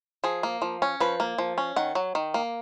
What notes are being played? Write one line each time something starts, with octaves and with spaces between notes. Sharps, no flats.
F3 G#4
A#3
F3
C#4
F3 B4
A#3
F3
C#4
D#3 F#5
F#3
D#3
A#3